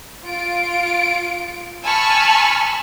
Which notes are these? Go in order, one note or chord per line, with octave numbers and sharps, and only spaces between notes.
F4 D7
G#5 A5 B5 C#6 E6 F6